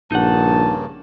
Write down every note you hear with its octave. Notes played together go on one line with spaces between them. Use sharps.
A#1 G2 C#3 A#3 D#4 F#5 A5